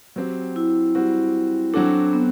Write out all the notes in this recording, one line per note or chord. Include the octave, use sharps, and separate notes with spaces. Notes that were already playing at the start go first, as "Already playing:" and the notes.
F#3 C4 G4
E4
G3 C4 F#4
F#3 C4 D4 F#4 A4
B3